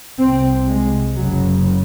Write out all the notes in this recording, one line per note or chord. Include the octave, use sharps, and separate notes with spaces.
C2 C3 C4
G#3
F#1 F#2 C#3 F#3